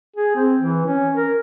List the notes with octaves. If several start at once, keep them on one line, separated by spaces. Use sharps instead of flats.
G#4
C4
E3
C#4
A#4